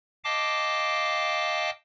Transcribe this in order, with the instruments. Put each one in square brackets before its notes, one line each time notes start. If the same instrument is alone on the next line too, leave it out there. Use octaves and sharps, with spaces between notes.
[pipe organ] D#5 F5 G5 A5 D6